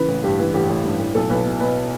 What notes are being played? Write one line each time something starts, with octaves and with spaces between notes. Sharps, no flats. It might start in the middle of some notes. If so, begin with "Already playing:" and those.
Already playing: C#3 E3 B4
A1
G2 G4
E3
A1 G4
A1
G2
A1
B1 A4
B1 B4
B2
B2 B4